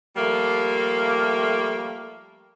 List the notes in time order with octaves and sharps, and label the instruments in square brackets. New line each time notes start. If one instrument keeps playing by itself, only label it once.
[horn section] F3 G3 A3 A#3